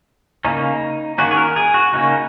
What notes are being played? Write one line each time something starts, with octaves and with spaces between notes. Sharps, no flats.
C#3 A#3 C#4 D#4
D#3 A#3 C#4 F#4
G#4
A#4
G#4
F#4
C#3 A#3 C#4 D#4